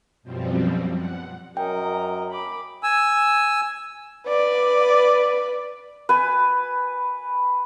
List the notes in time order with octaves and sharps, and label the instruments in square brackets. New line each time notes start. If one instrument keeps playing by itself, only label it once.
[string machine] F#2 B2 F3 G3 C4
F#5
[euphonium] F#2 [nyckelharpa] A#4 D#5 [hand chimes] G5
[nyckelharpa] B5 D6
[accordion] G#5 E6
[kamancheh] B4 D5
[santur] B4 G#5